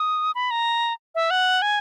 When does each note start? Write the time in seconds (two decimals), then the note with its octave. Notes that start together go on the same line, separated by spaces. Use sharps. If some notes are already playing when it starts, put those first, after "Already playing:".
Already playing: D#6
0.35 B5
0.51 A#5
1.15 E5
1.31 F#5
1.62 G#5